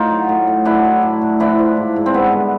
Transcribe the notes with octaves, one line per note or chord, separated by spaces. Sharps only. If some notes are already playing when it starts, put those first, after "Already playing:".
Already playing: A2 D#4 F4
F#3
A2
A2
F#3 D4 E4
F#3
A2
A2
F3 D4 E4
F3
G#2
G#2
C4
G2 B3
D3